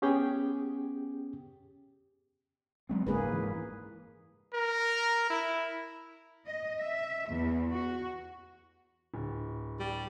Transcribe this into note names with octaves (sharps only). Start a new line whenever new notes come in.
B3 C#4 G4 G#4 G5
F#3 G#3 C4
F#1 C#2 G#2 A#3 G#4 B4
G#2 E3
A#4
E4
D#5
E5
E2
F#4
D1
G3